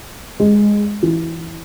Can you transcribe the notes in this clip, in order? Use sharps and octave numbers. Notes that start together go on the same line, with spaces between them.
G#3
E3